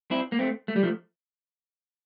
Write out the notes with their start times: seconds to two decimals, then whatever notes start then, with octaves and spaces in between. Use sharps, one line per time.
0.11 C4 E4
0.32 A#3
0.39 A3 C4
0.68 A3
0.76 G3
0.83 F3 A3